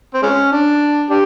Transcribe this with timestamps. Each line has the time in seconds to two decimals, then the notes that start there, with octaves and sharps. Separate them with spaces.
0.14 C4
0.22 G#3 C#4
0.52 D4
1.10 D4 G4